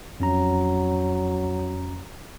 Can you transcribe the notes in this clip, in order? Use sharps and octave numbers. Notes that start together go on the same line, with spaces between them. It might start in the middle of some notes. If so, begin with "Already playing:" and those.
F2 F#3 C#4 A#5